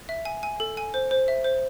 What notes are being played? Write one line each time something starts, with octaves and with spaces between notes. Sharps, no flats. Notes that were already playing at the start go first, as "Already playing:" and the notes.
E5
G#5
G#5
A4
G#5
C5
C5
E5
C5